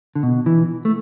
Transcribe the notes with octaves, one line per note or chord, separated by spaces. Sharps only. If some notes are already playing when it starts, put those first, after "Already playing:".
D3
B2
E3
A3